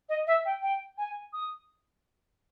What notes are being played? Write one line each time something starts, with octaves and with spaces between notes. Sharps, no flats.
D#5
E5
G5
G5
G#5
D#6